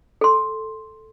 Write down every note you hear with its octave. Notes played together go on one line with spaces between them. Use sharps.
A4 C6